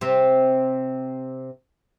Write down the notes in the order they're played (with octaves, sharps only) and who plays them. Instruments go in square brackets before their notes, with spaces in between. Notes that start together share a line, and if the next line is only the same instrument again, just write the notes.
[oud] C3 C4